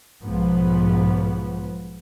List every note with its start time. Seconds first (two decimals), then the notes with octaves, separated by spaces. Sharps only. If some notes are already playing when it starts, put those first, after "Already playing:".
0.22 B1 G#2 F3 B3